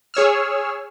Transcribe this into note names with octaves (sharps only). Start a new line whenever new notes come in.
G#4 C#5 E6 F6